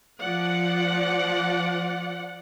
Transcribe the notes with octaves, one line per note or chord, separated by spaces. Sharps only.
F3 D5 F#5